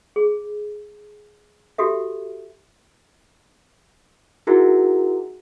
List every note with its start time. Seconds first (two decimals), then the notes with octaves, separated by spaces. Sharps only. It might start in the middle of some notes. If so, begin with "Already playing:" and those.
0.16 G#4
1.78 F#4 G4 A4 E5
4.47 D#4 E4 F#4 G#4 A#4